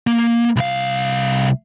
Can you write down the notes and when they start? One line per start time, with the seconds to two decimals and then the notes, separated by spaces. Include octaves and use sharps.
0.07 A#3
0.56 C2 F5